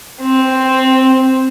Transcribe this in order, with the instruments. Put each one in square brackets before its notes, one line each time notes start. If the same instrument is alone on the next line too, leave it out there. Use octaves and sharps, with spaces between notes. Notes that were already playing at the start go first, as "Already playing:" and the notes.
[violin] C4